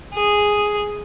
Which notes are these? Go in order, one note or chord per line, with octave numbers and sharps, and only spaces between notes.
G#4